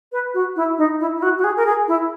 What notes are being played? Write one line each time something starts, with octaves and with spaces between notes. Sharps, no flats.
B4
F#4
E4
D#4
E4
E4
F#4
F#4
G#4
A#4
G#4
E4